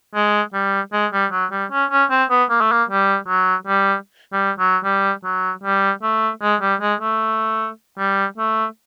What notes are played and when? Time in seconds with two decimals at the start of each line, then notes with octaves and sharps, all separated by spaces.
0.15 G#3
0.54 G3
0.93 G#3
1.13 G3
1.32 F#3
1.52 G3
1.72 C#4
1.91 C#4
2.10 C4
2.30 B3
2.50 A#3
2.61 A3
2.72 A#3
2.89 G3
3.28 F#3
3.67 G3
4.33 G3
4.59 F#3
4.84 G3
5.24 F#3
5.64 G3
6.03 A3
6.42 G#3
6.61 G3
6.81 G#3
7.01 A3
7.98 G3
8.38 A3